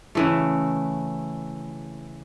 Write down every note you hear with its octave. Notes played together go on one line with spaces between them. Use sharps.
C#3 E3 A3